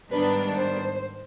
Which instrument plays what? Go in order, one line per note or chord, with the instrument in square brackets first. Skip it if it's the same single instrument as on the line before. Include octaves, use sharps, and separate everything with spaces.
[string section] G#2 D#3 G3 B3 D4 [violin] B4
[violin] C5